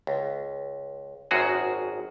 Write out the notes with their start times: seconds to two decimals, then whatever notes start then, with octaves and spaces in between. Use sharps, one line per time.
0.07 C#2
1.31 G#1 F#2 F#4 G#4